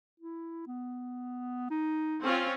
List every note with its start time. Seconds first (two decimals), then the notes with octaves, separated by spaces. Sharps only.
0.20 E4
0.68 B3
1.70 D#4
2.22 C4 C#4 F4